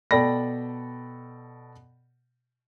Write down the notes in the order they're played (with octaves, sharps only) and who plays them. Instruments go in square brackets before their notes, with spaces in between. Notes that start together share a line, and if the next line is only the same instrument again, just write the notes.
[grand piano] B2 A4 D5 G5 B5 A#6